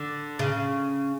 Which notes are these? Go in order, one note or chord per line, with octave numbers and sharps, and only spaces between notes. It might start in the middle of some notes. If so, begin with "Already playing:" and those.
Already playing: D3
C#3